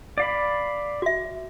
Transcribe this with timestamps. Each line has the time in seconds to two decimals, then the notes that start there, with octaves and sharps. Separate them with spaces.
0.18 D5 F5 B5
1.02 F#4 E5